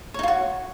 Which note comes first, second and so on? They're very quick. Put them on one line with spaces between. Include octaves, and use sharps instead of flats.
C#5 D#4 F4 F#4